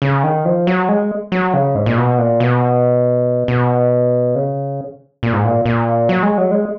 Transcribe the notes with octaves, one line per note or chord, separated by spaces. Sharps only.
C#3
D#3
F3
F#3
G#3
F#3
C#3
G#2
A#2
B2
A#2
B2
B2
C#3
A#2
G#2
A#2
A#2
F#3
G#3
F#3
G#3